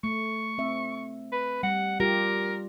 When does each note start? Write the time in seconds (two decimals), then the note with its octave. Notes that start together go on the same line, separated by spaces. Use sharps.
0.04 A3 C#6
0.58 C4 E5
1.32 B4
1.63 G3 F#5
2.00 G3 F4 G4 A#4